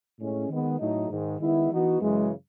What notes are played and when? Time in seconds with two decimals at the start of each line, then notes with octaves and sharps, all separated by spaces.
0.19 A2 G#3 C#4
0.49 D#3 G#3 B3
0.79 A2 F#3 A3 D#4
1.09 G#2 D#3 G#3
1.40 D#3 G#3 B3 E4
1.71 E3 B3 D#4 F#4
2.02 F#2 C#3 E3 G#3